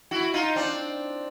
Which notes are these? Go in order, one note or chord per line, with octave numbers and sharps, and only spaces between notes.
E4 F#4
D#4 F4
C4 D4